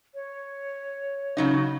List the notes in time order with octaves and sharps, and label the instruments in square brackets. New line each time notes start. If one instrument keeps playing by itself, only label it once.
[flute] C#5
[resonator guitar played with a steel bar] C#3 F#3 D#4